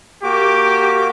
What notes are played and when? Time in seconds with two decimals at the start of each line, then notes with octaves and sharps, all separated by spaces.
0.23 A#3 F#4 G4 D6